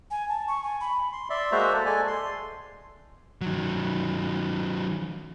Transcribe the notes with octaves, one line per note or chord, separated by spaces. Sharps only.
G#5
A5
C#6
G#5
B5
C6
D5 E5 C6
G#3 A#3 F#4 C5 E5 A#5
A4
G#3 A4 D5 G#5
C6
D#3 F#3